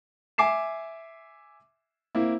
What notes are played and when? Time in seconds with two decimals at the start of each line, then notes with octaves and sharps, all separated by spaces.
0.38 E5 G#5 D6 C7 E7
2.15 A#3 C4 E4